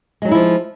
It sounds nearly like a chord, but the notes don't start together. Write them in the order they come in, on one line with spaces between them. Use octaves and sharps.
G#3 F#3 D#4 E4 F3